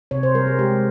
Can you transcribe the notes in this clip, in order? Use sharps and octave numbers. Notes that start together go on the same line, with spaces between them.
C3 C#5
C5
G3 A#4
G#4
G#3 G4